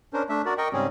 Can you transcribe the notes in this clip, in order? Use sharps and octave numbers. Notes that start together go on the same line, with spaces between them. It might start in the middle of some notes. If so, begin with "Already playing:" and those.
C#4 D4 A#4 C5
A3 D4 E5
F#4 A#4 D5
A#4 D#5 G5 C#6
G#2 C#3 G3 C4 C#4 G#4